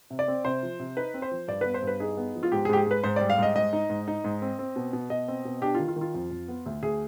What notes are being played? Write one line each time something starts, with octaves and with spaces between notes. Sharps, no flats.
C3
D5
C4
C3 C5
F3
C3
D#4 B4
C4
C5
F3
G2 D5
B3 B4
C5
G2 B4
D#4 G#4
B3
F3
F4
G#2 G4
G#4
G#2 G4
G#4
G#2 B4
G#2 C5
G3 D5
F5
G#2 D#5
G#2 D#5
D#4
G#2
D#4
G#2
C4
C4
B2
B2
B2 D#5
C4
B2
D4 G4
F4
D#3
F4
D#3
F4
F2
F2
B3
D2
D2 G#4